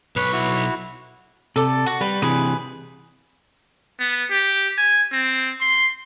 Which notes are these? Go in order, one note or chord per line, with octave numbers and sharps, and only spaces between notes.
B1 B4 C#5
E4 F#4
C3 A4 D5
F#4 F#5
G3 B4
C3 E3 G#4 B4
B3
G4
G#5
C4
C6